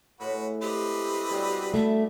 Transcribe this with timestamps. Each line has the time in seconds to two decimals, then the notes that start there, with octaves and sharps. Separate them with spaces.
0.20 A2 G#3 F#4 B4
0.62 C4 G4 B4 D#5
1.29 G2 B2 G3
1.74 A3 E5